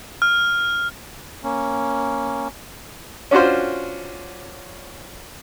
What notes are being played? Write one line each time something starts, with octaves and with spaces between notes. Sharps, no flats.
F6
A#3 C#4
C#4 D4 F4 F#4 C5